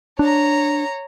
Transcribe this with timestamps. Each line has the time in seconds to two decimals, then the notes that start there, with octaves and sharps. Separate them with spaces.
0.19 D4 C#5 A#5